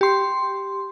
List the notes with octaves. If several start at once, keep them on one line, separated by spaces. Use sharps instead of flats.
G4 C6